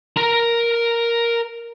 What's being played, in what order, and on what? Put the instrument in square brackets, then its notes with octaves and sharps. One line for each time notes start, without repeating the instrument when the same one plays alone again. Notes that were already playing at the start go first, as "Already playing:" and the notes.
[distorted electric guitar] A#4 A#5